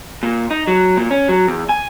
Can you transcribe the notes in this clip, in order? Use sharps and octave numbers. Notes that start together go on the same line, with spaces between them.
A#2
D#4
F#3
A#2
C#4
F#3
E2
G#5